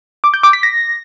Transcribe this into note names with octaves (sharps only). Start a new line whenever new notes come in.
D6
G6
D6
B6
A#6